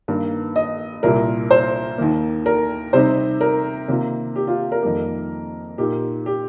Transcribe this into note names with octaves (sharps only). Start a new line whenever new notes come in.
G2 D#3 A#3
D#5
C2 A#2 G3 A#4
C5
D#2 D#3 A#3
A#4
C3 G3 C4 D#4 C5
A#4
C3 D#3 A#3 F4
G4
F4
A#4
F2 D#3 G3 A#3
A#2 A#3 D#4 G4
G4